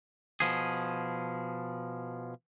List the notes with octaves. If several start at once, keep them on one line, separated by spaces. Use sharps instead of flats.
B2 F3 G#4